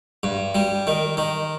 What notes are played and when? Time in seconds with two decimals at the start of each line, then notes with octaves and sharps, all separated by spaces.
0.23 G2
0.55 G3
0.87 D#3
1.17 D#3